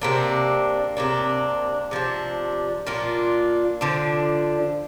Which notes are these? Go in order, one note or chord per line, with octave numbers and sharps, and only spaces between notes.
C3 A#3 D4
C3 A#3 D4
C3 F3 D4
A#2 A#3 D4 F4
D3 F3 D4